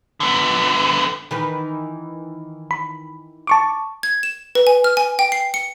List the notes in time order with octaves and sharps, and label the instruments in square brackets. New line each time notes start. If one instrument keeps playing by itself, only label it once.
[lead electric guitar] D3 B3
[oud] D#3 E3 B4
[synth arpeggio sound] B5
A5 C#6 D6
[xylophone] G#6
E7
B4
G#5
F6
G#5
G5
C7
C#7